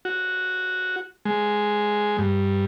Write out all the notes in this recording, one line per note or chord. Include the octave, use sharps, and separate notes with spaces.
F#4
G#3
G2